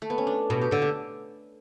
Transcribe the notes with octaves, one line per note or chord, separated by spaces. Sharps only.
A3
B3
C#4
D4
B2
G4
D3 A4
G4